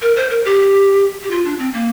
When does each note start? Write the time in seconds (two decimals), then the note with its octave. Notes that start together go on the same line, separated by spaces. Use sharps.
0.02 A#4
0.16 C5
0.30 A#4
0.45 G4
1.23 G4
1.31 F4
1.45 D4
1.59 C4
1.73 A#3